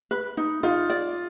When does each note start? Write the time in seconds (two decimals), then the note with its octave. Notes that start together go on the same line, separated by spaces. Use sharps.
0.11 B4
0.37 D#4
0.63 D#4 F4
0.90 D5